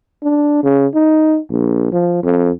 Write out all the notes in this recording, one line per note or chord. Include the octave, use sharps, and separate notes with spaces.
D4
C#3
D#4
A#1
F3
F2